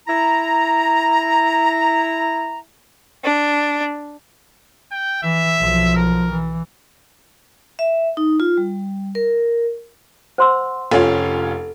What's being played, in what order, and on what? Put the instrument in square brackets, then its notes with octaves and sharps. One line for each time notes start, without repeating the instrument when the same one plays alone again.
[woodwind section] E4 A#5
[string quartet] D4
[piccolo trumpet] G5
[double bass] E3 [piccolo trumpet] E5
[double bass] B1 F3
[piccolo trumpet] A#4
[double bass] E3
[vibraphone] E5
D#4
F4
G3
A#4
[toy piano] C5 C6 E6 [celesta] F#5
[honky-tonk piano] F1 C#4 F4 [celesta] A4